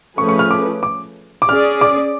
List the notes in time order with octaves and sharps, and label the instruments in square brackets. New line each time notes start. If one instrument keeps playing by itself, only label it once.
[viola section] F3 A3 C#4 G#4 B4 [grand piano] C#6
[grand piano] C#6
F6
D6
D6
D6
[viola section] C#4 G#4 D5 [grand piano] F6
[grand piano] D6